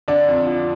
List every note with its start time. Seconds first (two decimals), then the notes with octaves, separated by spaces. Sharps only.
0.08 D3 D4 D5
0.28 F2
0.46 F3